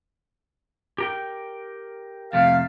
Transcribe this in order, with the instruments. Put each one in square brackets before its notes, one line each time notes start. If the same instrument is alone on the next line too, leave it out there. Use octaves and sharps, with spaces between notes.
[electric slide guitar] G4 A#4 G5
[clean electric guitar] F2 C3 A3 [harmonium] F5